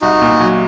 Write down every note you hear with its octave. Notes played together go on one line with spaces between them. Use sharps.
C2 D#4 F#4
A#2
F#3